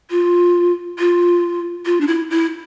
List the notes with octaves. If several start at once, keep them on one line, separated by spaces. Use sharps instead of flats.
F4
F4
F4
D4
E4
E4